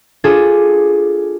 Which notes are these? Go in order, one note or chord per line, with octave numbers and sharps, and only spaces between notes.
D4 F4 G#4 A4